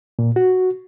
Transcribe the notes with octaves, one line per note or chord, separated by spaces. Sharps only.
A#2
F#4